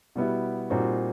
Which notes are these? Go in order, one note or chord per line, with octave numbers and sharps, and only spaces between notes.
B2 G3 B3 E4
A#2 G3 C4 D#4 F#4